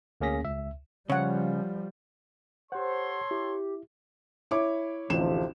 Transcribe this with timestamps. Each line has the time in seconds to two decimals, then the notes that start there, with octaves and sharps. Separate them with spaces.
0.21 D2 A#3 C#4 G#4 A#6 B6
0.44 C#2 E5
1.10 C#3 F3 G3 C#5 F#5
2.72 G4 A4 C5 C#5 F#5 C6
3.31 E4 G4
4.51 E4 C#5 D6
5.10 A1 D2 C3 F3 E7